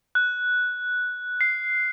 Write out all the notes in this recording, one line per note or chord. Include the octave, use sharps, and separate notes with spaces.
F#6
C7